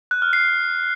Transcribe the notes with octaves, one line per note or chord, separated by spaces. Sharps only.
F#6
F6
C7